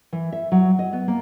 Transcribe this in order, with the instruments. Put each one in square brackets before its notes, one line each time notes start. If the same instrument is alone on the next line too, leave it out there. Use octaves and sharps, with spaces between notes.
[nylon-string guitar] E3
E5
F#3
D#5
B3
A#3